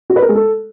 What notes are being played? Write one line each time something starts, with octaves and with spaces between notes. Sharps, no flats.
F#4
B4
A#4
G#3
A4